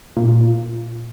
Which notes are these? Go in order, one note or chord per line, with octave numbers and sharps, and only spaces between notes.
A#2